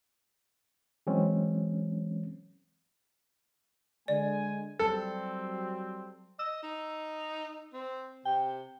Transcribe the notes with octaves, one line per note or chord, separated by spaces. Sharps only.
E3 F#3 G#3 C4 C#4
D3 G#3 D5 G#5
F#3 G3 C4 A4
D#5 E6
D#4
C4
C3 G5